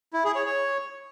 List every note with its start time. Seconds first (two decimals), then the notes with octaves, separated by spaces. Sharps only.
0.14 E4
0.24 G#4
0.35 C#5
0.46 C#5